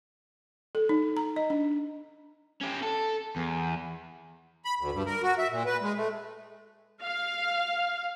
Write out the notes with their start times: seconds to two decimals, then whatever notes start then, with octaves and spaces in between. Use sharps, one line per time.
0.75 A4
0.89 D#4
1.17 A#5
1.36 D#5
1.50 D4
2.61 C#4 G4
2.82 A4
3.36 E2
4.65 B5
4.79 D2
4.92 G2
5.06 A#4
5.23 F#4
5.38 E5
5.50 A#2
5.66 B4
5.82 G#3
5.96 A3
7.03 F5